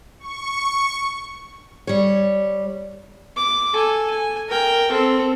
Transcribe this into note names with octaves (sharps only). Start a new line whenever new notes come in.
C#6
G3 C#5
D6
A4 G#5
G#5
A#4 G5
C4 A4